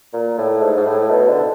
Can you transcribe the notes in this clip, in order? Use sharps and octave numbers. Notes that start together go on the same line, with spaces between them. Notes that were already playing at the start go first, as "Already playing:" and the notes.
A#2
A2
G#2
G#2
A2
B2
D3